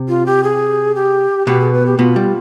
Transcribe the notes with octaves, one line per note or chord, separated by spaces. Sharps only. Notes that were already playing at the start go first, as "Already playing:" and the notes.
Already playing: C3
F4
G4
G#4
G4
B2 B3 G4
G#4
B4
G4
B2 B3 F4
G3